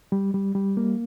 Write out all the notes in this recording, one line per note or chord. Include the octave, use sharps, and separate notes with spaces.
G3
G3
G3
A#3